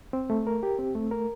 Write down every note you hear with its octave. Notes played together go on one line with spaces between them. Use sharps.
C4
A3
A#4
G4
C4
A3
A#4